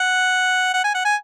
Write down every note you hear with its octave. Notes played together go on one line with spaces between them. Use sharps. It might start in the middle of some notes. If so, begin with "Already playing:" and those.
Already playing: F#5
F#5
G#5
F#5
G#5